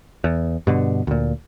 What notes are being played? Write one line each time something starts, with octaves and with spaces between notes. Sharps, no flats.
E2
G2 B2 D3
D2 A#2